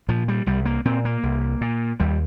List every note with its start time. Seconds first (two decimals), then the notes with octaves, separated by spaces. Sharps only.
0.09 A#2 F3
0.28 G3
0.46 C2 G3
0.66 A#3
0.85 A#2 C4
1.05 A#3
1.23 C2
1.61 A#2
2.00 D#2 G3